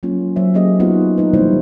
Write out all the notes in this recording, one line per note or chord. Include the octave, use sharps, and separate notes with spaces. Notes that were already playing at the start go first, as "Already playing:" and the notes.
F#3 A#3 C#4 F4
F#3 C5 E5
F#3 A#3 C#4 G4 G#4 D#5
A#3 B3 D#4 F4 F#4 B4
A3 D#4 B4
C3 E3 G3 A#3 E4 C5